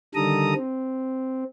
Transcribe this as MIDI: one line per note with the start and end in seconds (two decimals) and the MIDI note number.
0.15 0.54 50
0.15 0.54 51
0.15 0.54 55
0.15 0.54 69
0.15 0.54 82
0.15 0.54 87
0.55 1.44 60